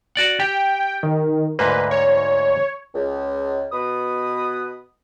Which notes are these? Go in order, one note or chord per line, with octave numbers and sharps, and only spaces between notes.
F#4 D5 F#5
G4 G5
D#3
D2 G#2 A#3 B4
C#5
C#2
B2 B4 D#6